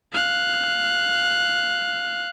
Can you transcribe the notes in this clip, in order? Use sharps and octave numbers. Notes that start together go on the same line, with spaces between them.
F5 F#6